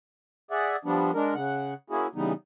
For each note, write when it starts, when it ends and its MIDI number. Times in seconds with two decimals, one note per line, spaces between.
0.51 0.76 68
0.51 0.76 74
0.51 0.76 76
0.51 0.76 78
0.85 1.11 53
0.85 1.11 55
0.85 1.11 59
0.85 1.11 62
1.14 1.34 56
1.14 1.34 62
1.14 1.34 70
1.34 1.74 49
1.34 1.74 78
1.90 2.07 58
1.90 2.07 61
1.90 2.07 64
1.90 2.07 66
1.90 2.07 68
2.15 2.33 49
2.15 2.33 52
2.15 2.33 55
2.15 2.33 59
2.15 2.33 63